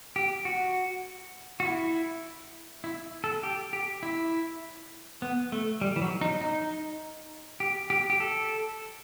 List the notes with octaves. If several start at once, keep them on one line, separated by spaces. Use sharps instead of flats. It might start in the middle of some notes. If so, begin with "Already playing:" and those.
G4
F#4
F#4
E4
E4
A4
G4
G4
E4
B3
A3
G3
E3
F#3
D#4
D#4
G4
G4
G4
A4